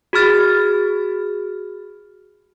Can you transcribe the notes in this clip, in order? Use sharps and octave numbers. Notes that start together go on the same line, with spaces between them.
F#4 G#4 B5 F6 A6